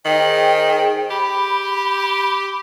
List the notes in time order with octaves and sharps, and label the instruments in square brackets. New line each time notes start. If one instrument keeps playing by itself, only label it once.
[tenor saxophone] D#3 [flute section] G#4 C5 G5
[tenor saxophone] G4 [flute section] B5